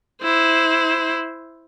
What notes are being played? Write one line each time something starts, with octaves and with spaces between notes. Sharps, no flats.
E4 C5